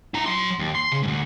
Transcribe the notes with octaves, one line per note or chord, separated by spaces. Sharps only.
E4 A#5
F#3 C6
D#2
C6
C#3
D2 G#2